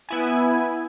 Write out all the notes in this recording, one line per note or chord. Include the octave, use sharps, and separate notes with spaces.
B3 E4 G#5